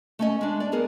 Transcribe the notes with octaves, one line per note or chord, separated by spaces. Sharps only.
A3 C#4 D#5
G#3 D4
D5
B3 G#4 A#4